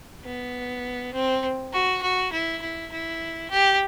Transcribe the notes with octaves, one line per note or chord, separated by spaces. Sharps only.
B3
C4
F#4
F#4
E4
E4
E4
G4